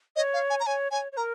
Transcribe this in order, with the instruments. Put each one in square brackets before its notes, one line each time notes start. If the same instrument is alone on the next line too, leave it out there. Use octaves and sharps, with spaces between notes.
[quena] C#5 [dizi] D#5
[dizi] F5
G#5
A#5
[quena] C#5 [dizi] G#5
[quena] C#5 [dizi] G#5
[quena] C#5
[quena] A#4 [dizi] A#5